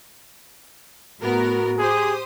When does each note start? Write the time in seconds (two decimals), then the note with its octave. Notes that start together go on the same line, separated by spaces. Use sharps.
1.21 A2 B3 F#4 A#4
1.79 G4 G#4 C5 D#6